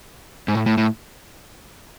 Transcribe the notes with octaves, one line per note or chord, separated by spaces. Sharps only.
G#2
A2
A2
A2